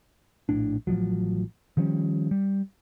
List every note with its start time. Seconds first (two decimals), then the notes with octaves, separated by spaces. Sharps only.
0.49 A#1 A2 D4
0.87 A1 C#3 F3 F#3
1.77 D#3 F3 G3 C#4
2.31 G3